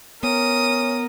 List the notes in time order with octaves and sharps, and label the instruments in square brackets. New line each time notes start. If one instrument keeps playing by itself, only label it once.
[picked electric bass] B3 [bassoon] C#4 [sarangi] A#4 [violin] D#6